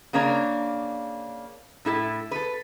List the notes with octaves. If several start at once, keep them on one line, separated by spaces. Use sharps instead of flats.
C#3 A#3 D4 C#5 A#5
A2 E4 A4
A4 B4